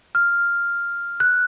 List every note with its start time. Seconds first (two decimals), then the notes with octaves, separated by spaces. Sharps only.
0.15 F6
1.20 F#6